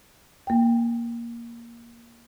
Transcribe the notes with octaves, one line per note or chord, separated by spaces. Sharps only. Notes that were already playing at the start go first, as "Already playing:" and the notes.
A#3 G5